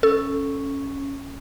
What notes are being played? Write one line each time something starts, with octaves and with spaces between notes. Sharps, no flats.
C#4 A4